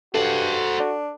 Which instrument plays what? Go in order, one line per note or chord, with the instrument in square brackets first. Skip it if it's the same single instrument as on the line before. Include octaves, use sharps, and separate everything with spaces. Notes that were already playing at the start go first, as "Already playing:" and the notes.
[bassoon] G2 [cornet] F#4 [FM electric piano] A4 [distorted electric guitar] C5 F#5
[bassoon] D4